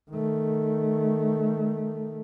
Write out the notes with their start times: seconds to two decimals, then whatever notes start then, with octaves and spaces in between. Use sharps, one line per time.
0.10 D#3 A3